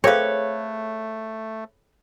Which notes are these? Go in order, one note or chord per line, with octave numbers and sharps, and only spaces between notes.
A3 C4 G#4 A4 B4 C#5 F5